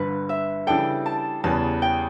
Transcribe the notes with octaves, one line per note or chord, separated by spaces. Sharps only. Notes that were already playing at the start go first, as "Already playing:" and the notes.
Already playing: G1 G2 D3 B4
E5
C#3 E3 G3 D4 A4 G5
A5
E2 C#3 G3 B3 A5
G5